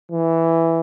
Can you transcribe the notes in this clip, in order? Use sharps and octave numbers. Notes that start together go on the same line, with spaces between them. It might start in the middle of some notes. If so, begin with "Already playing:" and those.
E3